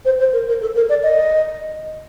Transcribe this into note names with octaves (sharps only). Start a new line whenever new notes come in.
C5
C5
A#4
A#4
A4
A#4
D5
D#5